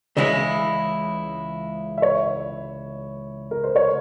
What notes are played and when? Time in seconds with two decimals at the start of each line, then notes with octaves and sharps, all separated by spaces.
0.17 C#2 C#3 E3 G#3 E4 C#5
1.98 E5
2.02 C#5
3.51 A#4
3.64 C5
3.76 C#5